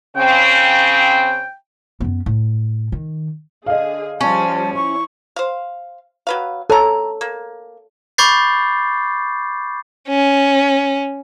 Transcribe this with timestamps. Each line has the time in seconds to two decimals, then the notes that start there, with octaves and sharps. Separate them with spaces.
0.16 C#3 C4 G5
2.00 F#2 B3
2.26 A2
2.92 D#3
3.66 D3 G#4 D#5 F5
4.21 F3 G3 C#4 A5
4.75 E4 C#6
5.36 C5 F5
6.27 F#3 B4 F5
6.70 A4 C#5 G#5 A#5
7.21 A#3
8.18 B5 C#6 D6 G6 A6 C7
10.08 C#4